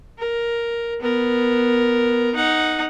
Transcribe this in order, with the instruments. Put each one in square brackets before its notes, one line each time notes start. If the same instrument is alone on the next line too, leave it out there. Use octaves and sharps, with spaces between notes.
[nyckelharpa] A#4
B3 A#4
D#4 F#5